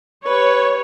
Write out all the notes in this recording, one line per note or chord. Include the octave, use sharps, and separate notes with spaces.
G4 B4 C#5